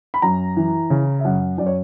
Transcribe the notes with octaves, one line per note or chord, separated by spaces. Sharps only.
B5
F#2 A#5
E3
C#3
E5
F#2 F#5
F#2 D5
C#5